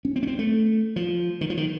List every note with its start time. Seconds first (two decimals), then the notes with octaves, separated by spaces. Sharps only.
0.05 C#4
0.16 C4
0.23 C#4
0.27 C4
0.39 A3
0.96 F3
1.41 D#3
1.50 F3
1.57 D#3